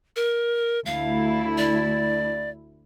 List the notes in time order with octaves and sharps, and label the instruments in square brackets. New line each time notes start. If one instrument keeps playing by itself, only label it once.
[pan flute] A#4
[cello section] D2 A3 E4 [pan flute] F5
[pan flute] D5